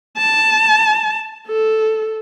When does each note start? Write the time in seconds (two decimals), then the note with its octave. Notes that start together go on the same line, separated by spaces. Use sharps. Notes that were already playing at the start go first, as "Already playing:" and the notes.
0.18 A5
1.47 A4